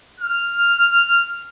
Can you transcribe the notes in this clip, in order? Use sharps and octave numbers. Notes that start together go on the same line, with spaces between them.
F6